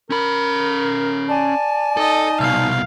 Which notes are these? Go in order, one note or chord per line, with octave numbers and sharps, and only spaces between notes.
C#4 A#4 B5
D5 G#5 A5
D#4 A4 D#5
C2 B2 F5